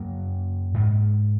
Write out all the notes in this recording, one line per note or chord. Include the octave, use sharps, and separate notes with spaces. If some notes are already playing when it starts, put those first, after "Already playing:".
Already playing: F#2 C#3 F#3 A#3
G#2